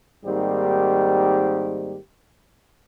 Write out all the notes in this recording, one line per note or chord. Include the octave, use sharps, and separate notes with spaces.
G#2 D#3 G3 A#3 C4 G4